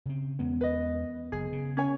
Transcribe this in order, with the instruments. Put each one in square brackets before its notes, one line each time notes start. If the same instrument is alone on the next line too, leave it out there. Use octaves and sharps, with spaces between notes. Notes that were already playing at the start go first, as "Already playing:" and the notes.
[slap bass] C#3 C4
[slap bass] E2 G#3 C#4 [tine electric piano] B3
[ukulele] B4 D#5
[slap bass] F#1 [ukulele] G#4
[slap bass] C#3
[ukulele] C#4 C#5 G#5 [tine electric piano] G#6